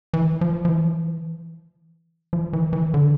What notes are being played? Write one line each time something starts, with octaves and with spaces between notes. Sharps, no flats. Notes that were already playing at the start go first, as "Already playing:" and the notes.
E3
F3
F3
E3
F3
E3
E3
D3